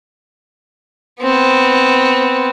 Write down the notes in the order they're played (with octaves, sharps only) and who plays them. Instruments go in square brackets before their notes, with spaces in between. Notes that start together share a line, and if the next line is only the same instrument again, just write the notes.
[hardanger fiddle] B3 C4